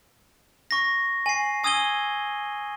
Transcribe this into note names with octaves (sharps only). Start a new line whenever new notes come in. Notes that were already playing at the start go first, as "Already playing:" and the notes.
C#6 A#6
G#5 C7
G#5 D#6 E6 G#6 D#7 G7